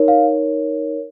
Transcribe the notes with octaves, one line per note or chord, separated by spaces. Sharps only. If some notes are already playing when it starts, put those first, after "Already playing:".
Already playing: D#4 A#4 C#5
F5